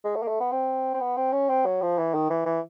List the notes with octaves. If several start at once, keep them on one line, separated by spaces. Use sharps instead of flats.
G#3
A3
A#3
A3
B3
C4
C4
B3
C4
C#4
C4
F#3
F3
E3
D#3
E3
E3